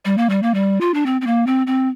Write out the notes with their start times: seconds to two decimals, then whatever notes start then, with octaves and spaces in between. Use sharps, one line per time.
0.05 G3
0.18 A#3
0.30 G3
0.43 A#3
0.54 G3
0.81 F4
0.94 D4
1.06 C4
1.21 C4
1.27 A#3
1.47 C4
1.67 C4